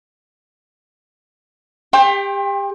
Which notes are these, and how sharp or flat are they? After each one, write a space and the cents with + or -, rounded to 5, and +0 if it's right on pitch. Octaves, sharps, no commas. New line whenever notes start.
G4 +30 G5 +5 C6 +35